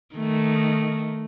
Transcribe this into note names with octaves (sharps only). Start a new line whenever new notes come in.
D#3 A3